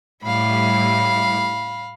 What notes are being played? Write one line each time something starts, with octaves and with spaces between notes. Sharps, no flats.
A2 G3 E4 F5 B5